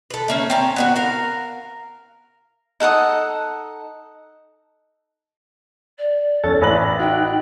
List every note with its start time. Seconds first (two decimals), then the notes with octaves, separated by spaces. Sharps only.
0.10 A4 B4
0.28 A3 A#3 C#4
0.50 C4 C#4 A#5
0.76 B3 C#4 F#4
0.96 A#4 F5
2.80 D#4 A4 F#5 D#6
5.98 D5
6.43 F2 C#4 A4 A6
6.61 A1 B4 A#5 F#7
6.99 D#4 F#4 G5 F#6